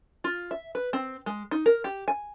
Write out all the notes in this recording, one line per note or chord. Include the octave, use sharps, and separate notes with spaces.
F4
E5
B4
C4
G#3
D#4
A#4
G4
G#5